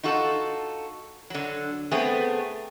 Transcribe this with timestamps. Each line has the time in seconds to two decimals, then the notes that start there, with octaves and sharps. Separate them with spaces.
0.03 D#4 F4 F#4 A4
1.30 D3 F#3
1.91 A3 B3 C4 G#4